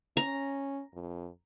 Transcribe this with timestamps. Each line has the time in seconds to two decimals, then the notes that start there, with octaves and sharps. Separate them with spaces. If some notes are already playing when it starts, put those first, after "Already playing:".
0.17 C#4 A#5
0.94 F2